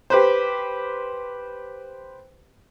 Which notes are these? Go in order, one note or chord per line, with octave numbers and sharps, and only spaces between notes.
G4 B4 C5